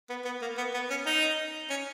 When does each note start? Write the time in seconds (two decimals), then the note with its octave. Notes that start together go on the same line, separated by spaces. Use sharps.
0.10 B3
0.25 B3
0.42 A#3
0.57 B3
0.74 B3
0.90 C#4
1.06 D#4
1.70 C#4